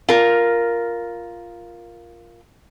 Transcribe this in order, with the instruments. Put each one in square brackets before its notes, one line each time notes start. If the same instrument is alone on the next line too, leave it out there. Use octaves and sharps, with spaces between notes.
[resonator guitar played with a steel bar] F4 A#4